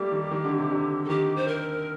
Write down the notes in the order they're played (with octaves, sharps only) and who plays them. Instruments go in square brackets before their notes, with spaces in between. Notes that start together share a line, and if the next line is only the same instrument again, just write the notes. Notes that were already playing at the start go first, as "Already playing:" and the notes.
Already playing: [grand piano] G3 A3 A#3 [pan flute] G4
[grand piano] D#3
D#3
D3
C3
D3
[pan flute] A4
[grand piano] D#3 [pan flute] G4
[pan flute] C5
A#4